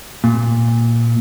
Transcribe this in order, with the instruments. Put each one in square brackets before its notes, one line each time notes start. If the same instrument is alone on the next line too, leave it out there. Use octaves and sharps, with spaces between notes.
[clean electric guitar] A#2